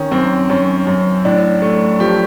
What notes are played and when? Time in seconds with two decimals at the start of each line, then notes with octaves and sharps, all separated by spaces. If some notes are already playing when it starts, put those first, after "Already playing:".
Already playing: D#3 C#4
0.11 F#2 C4
0.50 F#2 C#4
0.87 F#2
1.25 A2 D4
1.62 A3
2.00 F3 G4